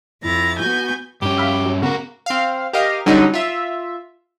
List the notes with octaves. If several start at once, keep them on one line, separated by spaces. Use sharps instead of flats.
F2 E4 A#5 A6
B3 F#4 G#5 G6
G2 C#4 G4
E5 F5 B5
F#3
C#3 B3 F#4 A#4
C4 F5
G4 A#4 D#5 F5
D3 F#3 G3 C#4 D#4 F#4
F4 E5